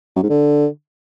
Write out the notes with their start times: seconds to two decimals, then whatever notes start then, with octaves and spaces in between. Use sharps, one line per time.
0.16 F#2
0.23 G#2
0.30 D3